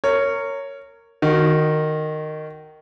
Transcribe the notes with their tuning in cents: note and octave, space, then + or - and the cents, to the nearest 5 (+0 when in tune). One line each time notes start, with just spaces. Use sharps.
A#4 -20 C#5 +0
D#3 -15 F#4 +0